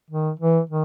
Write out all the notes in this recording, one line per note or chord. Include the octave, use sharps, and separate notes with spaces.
D#3
E3
D#3